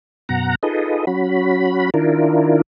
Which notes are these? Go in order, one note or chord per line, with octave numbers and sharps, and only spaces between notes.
F#2 B2 F#5 A#5
D#4 F4 G#4 A4 B4 D#5
F#3 C#4 F#4 B5
D#3 D4 E4 F4 A#4